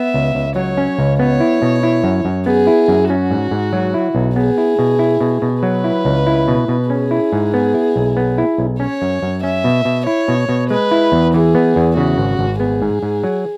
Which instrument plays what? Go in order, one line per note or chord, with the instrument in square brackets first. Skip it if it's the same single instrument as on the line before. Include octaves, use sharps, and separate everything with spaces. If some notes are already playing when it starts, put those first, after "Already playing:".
Already playing: [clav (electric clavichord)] B3 [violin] E5
[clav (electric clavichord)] C#2
C#2
[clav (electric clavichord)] F#3 [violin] C#5
[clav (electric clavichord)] C#4
C#2
[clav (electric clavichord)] B3 [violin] C#5
[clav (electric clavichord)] E4
B2
E4
F#2
F#2
[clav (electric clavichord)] B3 [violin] G#4
[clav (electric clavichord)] E4
F#2
[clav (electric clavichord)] C#4 [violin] F#4
[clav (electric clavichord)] G#2
G#2
F#3
E4
B1
[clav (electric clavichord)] B3 [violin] G#4
[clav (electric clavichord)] E4
B2
E4
B2
B2
[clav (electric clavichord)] F#3 [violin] B4
[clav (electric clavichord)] E4
C#2
E4
B2
B2
[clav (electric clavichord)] C#4 [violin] G#4
[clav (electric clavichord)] E4
G#2
B3
E4
B1
B3
E4
B1
[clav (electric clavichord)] C#4 [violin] C#5
[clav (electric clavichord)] F#2
F#2
[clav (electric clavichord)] C#4 [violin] E5
[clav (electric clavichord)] B2
B2
[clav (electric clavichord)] E4 [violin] C#5
[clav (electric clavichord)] B2
B2
[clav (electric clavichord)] G#3 [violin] B4
[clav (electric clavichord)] E4
E2
[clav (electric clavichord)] E3 [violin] G#4
[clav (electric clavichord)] B3
E2
[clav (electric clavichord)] C#3 [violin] F#4
[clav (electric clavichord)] G#1
G#1
[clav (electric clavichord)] B3 [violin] G#4
[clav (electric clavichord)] G#2
G#2
F#3